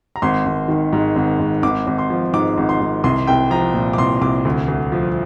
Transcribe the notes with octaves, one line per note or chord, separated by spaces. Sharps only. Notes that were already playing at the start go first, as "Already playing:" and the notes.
A#5
G#1 C6
G#1
D#3
G#2
G#1
G#1
G#1 D6
G#1
C6
F3
G#2 D6
G#1
C6
G#1
C2 C6
C2 G5
F3 A#5
A#2
D6
C2 C6
C2 D6
D2
D2
F3